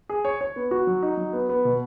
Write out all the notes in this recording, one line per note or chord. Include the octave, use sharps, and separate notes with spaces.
G#4
C#5
C#5
B3
F#4
F#3
D#4
F#3
B3
B3
B2